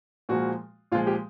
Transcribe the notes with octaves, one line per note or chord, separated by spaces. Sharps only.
A#2 F3 G#3 F#4
A#2 F3 G#3 F4
G4